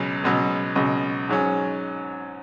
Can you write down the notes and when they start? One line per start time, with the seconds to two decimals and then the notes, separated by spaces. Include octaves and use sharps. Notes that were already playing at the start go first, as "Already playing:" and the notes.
Already playing: C#2 B2 F#3
0.24 C#2 B2 F#3
0.76 C#2 B2 F#3
1.29 G#2 F#3 C#4